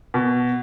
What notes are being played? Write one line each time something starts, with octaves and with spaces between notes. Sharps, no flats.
B2